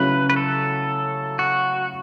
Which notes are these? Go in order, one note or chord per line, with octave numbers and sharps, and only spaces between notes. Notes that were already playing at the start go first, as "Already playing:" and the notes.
Already playing: C#3 F#3 A3 C#4 E4 B4
B4
A4
F#4